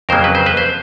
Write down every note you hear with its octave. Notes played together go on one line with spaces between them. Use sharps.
F2 C#3 F#3 A#3 A#4 C5
B4
C5
B4
C5